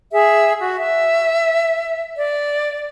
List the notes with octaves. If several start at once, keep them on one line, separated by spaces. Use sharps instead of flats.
G#4 E5
F#4
E5
D5